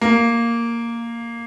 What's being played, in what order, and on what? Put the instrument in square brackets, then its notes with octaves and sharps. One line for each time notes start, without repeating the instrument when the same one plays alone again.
[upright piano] A#3